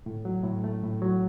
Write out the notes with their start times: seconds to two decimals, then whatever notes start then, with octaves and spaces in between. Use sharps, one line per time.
0.06 A2
0.25 F#3
0.44 A2
0.64 A3
0.83 A2
1.02 F#3